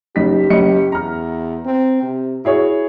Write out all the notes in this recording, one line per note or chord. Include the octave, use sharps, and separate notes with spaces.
F#1 D#4 G4 B6
F#1 D#5 C#7
E2 A#5 F6
C4
C3
E4 F#4 G#4 C#5